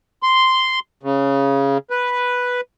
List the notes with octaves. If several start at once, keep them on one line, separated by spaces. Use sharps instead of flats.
C6
C#3
B4